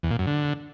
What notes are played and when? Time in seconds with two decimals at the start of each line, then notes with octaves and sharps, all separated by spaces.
0.03 E2
0.11 A#2
0.19 F#2
0.27 D3